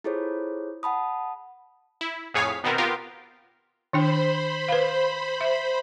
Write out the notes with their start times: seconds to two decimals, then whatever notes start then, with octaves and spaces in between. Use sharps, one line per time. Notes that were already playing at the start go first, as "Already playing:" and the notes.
0.04 E4 F4 G#4 A4 C5 C#5
0.83 F#5 A5 B5 D#6
2.01 E4
2.34 F2 A2 G#4 C#5 F5 B6
2.64 B2 D#3 B3 C4 A#4
2.78 B3 F4 G4 A#4 F5
3.93 D#3 D4 C5 G5 B5
4.68 B4 F5
5.41 E5